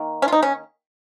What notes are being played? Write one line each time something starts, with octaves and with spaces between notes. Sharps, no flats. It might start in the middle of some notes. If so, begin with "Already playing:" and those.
Already playing: D#3 A#3
C#4
F4
D#4
C#4